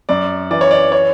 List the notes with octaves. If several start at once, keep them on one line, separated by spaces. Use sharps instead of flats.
F#2 D5
E3 D5
C#5
D5
C#5